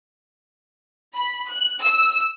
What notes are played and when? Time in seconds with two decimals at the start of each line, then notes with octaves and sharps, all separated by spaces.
1.16 B5
1.49 F#6
1.82 E6